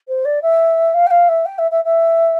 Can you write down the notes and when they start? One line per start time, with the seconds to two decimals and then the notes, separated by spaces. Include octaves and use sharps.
0.08 C5
0.25 D5
0.42 E5
0.94 F5
1.07 G5
1.11 F5
1.29 E5
1.46 G5
1.58 E5
1.71 E5
1.85 E5